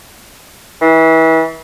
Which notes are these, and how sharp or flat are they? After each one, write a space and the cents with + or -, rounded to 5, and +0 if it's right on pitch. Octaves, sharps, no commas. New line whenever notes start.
E3 -30